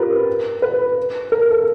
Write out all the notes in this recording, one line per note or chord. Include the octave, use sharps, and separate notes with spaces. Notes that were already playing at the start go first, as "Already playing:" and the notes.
Already playing: F4 G4 A#4 B4
B4
A#4
A4